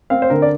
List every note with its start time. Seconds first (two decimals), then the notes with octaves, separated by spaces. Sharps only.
0.10 C4 F5
0.22 C5
0.30 D3 A#4
0.42 D5